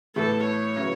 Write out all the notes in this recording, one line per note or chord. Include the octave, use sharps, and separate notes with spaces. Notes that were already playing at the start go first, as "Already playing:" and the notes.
A2 E3 B3 A4
C#5
C#3 F#3 B3 E4